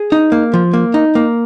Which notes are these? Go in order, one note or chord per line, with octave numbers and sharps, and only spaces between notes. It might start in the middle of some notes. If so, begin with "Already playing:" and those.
Already playing: G#4
D#4
A#3
F3
A#3
D#4
A#3